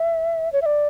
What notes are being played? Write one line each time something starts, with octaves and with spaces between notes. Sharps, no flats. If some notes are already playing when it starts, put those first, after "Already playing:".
Already playing: E5
C#5
E5
D5